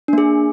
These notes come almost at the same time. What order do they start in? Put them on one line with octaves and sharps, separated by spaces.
D4 A#3 G#4